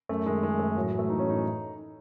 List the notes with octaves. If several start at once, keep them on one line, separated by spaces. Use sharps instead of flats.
F#2 A3
D#3 G#3
D#3 G#3
F#2 A3
A2 F#3
E3
A3
E3 D#4
C#4
A2 D#4